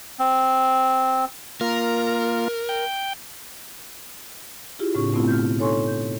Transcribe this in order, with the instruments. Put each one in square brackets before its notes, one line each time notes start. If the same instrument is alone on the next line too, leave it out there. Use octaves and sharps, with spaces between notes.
[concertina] C4
[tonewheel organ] A#3 F4 [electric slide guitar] A#4
[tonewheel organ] G5
[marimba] E4 F4 G4 G#4
A2 C#3 C4 D4 G4 C#6
B2 A3 B3 C4 E4 F4
F6 G6
D#4 A4 C#5 G#5 C6 C#6
G6